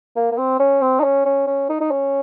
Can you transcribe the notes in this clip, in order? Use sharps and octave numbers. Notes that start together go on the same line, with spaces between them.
A#3
A#3
C4
C#4
C4
D#4
C#4
C#4
C#4
D#4
D#4
C#4